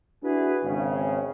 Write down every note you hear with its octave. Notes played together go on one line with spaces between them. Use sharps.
D4 E4 F#4 G#4 B4
G#1 C#3